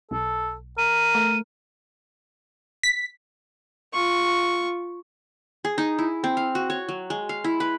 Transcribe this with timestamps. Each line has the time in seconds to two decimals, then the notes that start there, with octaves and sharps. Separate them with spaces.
0.11 B1 A4
0.78 A#4 D#7
1.15 A3
2.83 B6
3.93 F4 C#6
5.65 G#4
5.78 D#4
5.99 E4
6.24 C4
6.37 F5
6.55 F#4
6.70 C#5
6.89 F#3
7.10 G#3
7.29 F5
7.44 E4
7.60 B4